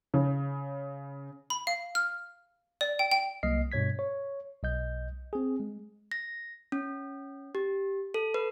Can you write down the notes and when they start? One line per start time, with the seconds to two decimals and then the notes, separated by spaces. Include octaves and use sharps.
0.14 C#3
1.50 B5
1.67 F5
1.95 F6
2.81 D5
2.99 G5
3.11 G5
3.43 C2 F#3 A#3 D#5 F6 C7
3.72 G2 B2 C#5 G#6 B6
3.99 C#5
4.63 B1 D#5 G6
5.33 C4 G#4
5.60 G#3
6.12 A#6
6.72 C#4
7.55 G4
8.14 A4
8.34 B4